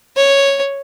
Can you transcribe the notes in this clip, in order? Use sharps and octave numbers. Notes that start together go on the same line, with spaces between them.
C#5